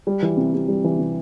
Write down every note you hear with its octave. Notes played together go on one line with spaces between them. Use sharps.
G3
E3
C3
C3
G3
E3
C3